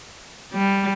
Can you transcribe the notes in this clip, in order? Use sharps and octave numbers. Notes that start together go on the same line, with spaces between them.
G3